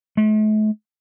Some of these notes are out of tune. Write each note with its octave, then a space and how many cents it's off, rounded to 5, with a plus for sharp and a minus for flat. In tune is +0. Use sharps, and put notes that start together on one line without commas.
A3 -45